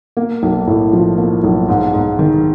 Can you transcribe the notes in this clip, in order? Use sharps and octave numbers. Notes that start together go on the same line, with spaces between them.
A#3
B1
A2
F3
A#3
B1
G#2
G#2
D#3